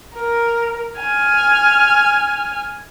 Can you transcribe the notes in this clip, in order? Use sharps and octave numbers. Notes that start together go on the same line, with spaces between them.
A#4
G#5 F6